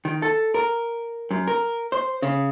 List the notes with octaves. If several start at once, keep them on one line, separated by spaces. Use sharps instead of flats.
D#3
A4
A#4
F#2
A#4
C5
C#3